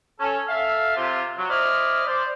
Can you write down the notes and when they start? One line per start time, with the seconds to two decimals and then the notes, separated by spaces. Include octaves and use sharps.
0.20 C#4 A4
0.48 A4 E5 F5
0.97 C3 F4
1.38 F#3
1.49 E4 C5 D5 D#5 B5 F6
2.06 C5 D5